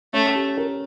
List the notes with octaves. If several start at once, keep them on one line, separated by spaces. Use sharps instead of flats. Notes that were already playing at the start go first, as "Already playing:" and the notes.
A3 C#4
G4
A#4